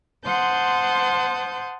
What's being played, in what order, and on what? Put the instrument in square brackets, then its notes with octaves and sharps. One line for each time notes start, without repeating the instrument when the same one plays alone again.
[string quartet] C5 F#5 A5 C6 D#6 G6